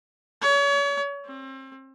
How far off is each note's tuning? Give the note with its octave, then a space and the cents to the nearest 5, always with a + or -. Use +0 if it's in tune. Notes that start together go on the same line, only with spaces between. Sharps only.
C#5 +35
C4 +35